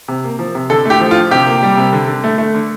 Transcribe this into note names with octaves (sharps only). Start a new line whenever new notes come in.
C3
A#3
F3
C3
D3 A4
A3 G4
F3
F4
D3
C3 G4
A#3
G3
C3
D3
D3
A3
A3
D3